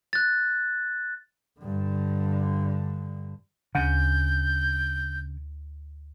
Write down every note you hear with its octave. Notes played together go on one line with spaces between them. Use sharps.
F#6 A6
G2 D3
D2 C#3 G6